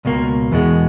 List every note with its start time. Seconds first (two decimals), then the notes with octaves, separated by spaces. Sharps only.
0.05 C#2 B2 A#3
0.51 E2 B2 G#3